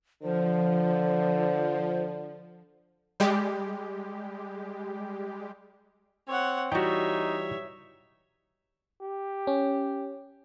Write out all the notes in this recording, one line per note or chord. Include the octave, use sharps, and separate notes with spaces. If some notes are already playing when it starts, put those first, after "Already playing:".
D3 F3 C5
G3 G#3 G4
C4 C#5 F#5
E3 G3 D#4 F#4 C#5 E5 G5
G4
C#4